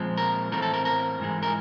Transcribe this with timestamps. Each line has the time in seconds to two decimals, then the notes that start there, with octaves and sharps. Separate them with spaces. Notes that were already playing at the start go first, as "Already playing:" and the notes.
Already playing: A#2 F3 G#3 C4
0.17 A#4
0.51 A2 E3 A3 C4 A#4
0.62 A4
0.74 A#4
0.85 A#4
1.19 G#2 E3 G#3
1.43 A#4